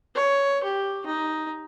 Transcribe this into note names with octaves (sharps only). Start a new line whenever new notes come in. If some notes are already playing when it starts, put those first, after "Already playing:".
C#5
G4
D#4